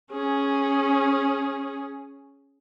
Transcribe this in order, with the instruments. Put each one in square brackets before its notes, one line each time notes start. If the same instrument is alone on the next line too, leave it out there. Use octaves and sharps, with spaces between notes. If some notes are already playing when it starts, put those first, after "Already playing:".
[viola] C#4 G#4